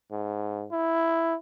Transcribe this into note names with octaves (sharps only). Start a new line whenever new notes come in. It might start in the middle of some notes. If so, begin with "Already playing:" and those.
G#2
E4